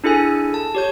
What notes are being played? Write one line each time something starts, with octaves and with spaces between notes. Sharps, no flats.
D4 E4 G#4 A4 G#5
A5
G4 C#5 G6